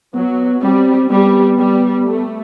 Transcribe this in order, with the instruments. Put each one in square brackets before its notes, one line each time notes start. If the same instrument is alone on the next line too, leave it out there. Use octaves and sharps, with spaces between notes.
[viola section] F#3 [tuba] B3
[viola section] G3 [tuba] C4
[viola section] G3 [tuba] B3
[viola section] G3
A3